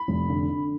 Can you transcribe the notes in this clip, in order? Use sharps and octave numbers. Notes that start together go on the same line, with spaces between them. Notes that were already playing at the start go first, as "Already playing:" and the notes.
Already playing: B5
F1
D3
D3